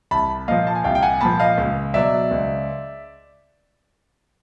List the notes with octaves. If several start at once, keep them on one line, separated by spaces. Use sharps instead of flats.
C2 A5 B5
A#2 F3 D#5 F5
A5
G#5
C2 F5 G5
G5
F#5 G#5
A#2 F3 A5 B5
D#5 F5
C#2
B2 F#3 D5 E5
C#2